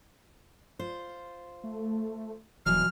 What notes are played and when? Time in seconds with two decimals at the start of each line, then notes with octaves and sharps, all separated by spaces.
0.79 F4 C5
1.63 A3
2.66 D#1 B2 E3 F#3 F6